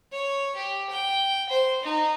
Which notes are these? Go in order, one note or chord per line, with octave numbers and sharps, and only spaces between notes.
C#5
G4
G5
C5
D#4